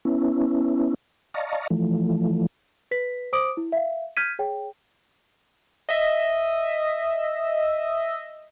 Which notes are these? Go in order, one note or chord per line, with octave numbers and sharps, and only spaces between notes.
B3 C#4 E4
D5 D#5 F5 A5 A#5 C#6
E3 F3 A3
B4 B6
C5 D6 D#6 D7
E4
E5 F5
F6 G6 G#6 B6 D#7
G#4 C#5 G5
D#5 E5